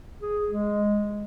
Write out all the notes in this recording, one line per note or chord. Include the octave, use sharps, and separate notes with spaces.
G#4
G#3